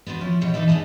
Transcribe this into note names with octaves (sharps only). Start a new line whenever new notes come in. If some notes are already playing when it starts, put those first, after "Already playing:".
B3 D4 F#4 C5
F3 C#4 E4
B2 G3 C#5
E3 D4 D#4 B4 E5
B3 D4 D#4 G#4 A5